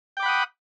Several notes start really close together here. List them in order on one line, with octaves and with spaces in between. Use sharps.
G5 D6 B5 F#5 D#6